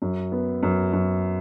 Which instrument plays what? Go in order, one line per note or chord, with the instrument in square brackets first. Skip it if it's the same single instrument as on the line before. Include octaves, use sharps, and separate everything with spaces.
[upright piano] F#2
B3
F#2
F#2